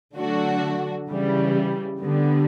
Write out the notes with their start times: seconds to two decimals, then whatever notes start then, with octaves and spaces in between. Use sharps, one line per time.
0.17 D3 F#3 A3 D4 F#4
1.09 C#3 E3 G3
2.00 D3 G3 B3